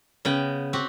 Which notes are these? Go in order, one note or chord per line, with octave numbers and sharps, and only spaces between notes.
C#3 B3 G5
C4 F#4 G4